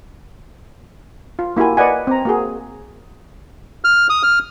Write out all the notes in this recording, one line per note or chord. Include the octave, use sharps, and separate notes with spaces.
F4
A#3 E4 F#4 G4 G#5
B4 D5 D#5 F#5 G#5
C4 A#5
A#3 F#4 G#4
F6
D#6
F6